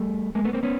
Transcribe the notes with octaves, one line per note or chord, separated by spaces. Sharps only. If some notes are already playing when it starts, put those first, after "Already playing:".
Already playing: G3 A3
G#3 A#3
A3 B3
A#3 C4
B3 C#4